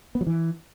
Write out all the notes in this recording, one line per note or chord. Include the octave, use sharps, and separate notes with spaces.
B3
F#3
E3